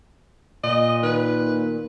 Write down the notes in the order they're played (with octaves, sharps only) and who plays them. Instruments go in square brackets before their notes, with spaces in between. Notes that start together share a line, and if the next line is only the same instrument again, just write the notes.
[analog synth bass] A#2 [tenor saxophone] D#5
[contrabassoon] D#3 [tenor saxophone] B4